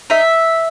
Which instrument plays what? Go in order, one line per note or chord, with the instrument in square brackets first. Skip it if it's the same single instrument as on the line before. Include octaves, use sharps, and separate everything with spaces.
[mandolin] D#4 E5